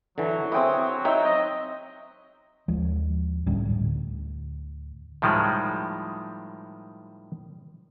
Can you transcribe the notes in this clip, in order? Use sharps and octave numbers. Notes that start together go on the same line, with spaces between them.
D3 E3 F#3
C4 E4 G#4 G5 D#6
D#4 C#5 E5 G5
D#5
D#2 F3 G#3
D2 A2 G3 C#4
D2 A2
A2 D#3 F3 G3 G#3